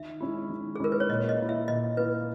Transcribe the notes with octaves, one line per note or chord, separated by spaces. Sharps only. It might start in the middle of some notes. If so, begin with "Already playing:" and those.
Already playing: D#3 E5
G#3 C#4 E4
D#3
G#4
G#3 C#4 E4 A#4
B4
C#5
A#2 D#5
D#5
A#3 E4
E5
A#2 D#5
A#3 E4 B4